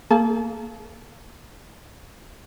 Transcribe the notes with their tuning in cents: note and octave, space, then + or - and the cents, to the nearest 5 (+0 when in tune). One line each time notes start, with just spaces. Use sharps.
A#3 -20 G#4 +35 A5 -30